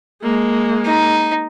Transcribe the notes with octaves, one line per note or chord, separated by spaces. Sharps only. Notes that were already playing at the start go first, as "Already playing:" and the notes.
G#3 A#3
D#4